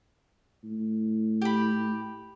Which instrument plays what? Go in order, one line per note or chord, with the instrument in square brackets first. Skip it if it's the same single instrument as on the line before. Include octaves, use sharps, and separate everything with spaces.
[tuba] A2
[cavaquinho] G4 B5